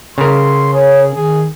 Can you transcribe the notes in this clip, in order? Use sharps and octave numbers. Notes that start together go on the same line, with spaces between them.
C#3 A#4 C6
G#4 C#5
D#3 G#4